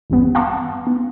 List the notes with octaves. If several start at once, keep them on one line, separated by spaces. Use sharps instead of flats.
G#1 E2 G2 G3 B3
F5 F#5 A5 A#5 C6 D6
B3